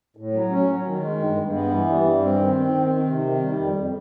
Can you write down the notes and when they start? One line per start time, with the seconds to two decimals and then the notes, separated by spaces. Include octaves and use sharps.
0.17 A2
0.33 F#3
0.50 C#4
0.67 F#3
0.84 D#3
1.01 G#3
1.19 G2
1.36 G2
1.53 B3
1.70 E3
1.86 G3
2.04 G2
2.20 C4
2.38 D#3
2.55 C4
2.72 D#3
2.89 D#3
3.06 C3
3.24 D#3
3.41 G3
3.57 F2
3.75 F2